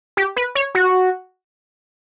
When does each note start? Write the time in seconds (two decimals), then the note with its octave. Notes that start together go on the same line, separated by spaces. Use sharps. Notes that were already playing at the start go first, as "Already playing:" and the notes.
0.17 G4
0.36 B4
0.55 C#5
0.75 F#4